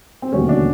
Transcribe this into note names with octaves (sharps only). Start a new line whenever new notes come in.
C4
E1 D#2 D3 F#3 A3 C#4
D4